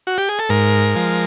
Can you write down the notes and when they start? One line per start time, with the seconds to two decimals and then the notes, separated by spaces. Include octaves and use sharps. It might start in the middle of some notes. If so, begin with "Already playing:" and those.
0.07 F#4
0.18 G4
0.29 G#4
0.39 A4
0.49 G#2 A#4
0.95 F3 G#3